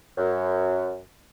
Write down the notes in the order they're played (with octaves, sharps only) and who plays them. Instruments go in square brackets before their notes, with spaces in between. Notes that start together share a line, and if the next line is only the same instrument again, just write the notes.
[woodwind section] F#2